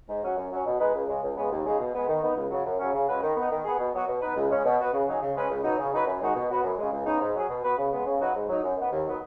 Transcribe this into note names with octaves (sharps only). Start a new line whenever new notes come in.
G#2
F#3 C#4 F#4
F#2
F#3 C#4
B2
G#3 D#4 B4
C#2
C#3 G#3
C#2
C#3 G#3 B3
D#2
C#3 G#3 D#4 G#4
B2
G#3 B3
D#3
B3 D#4
C#2
C#3 F#3
F#2
C#3 F#3 C#4
C#3
G#3 C#4 F#4 B4
D#3
B3 D#4
D#3
B3 G#4
B2
F#3 B3 F#4
B2
B3 D#4 B4
C#2
C#3 G#3 C#4
B2
B3 F#4 B4
C#3
F#3 D#4 G#4
C#3
G#3 C#4 B4
C#2
B2 F#3 B3 D#4
C#3
F#3 D#4 B4
F#2
D#3 G#3 D#4 F#4
B2
B3 F#4 B4
F#2
C#3 G#3
C#2
C#3 B3 D#4
G#2
F#3 C#4 G#4
B2
B3 F#4 B4
C#3
G#3 B3
C#3
F#3 D#4 F#4 B4
G#2
F#3 D#4
F#2
D#3 B3
D#2
D#3 F#3 B3 D#4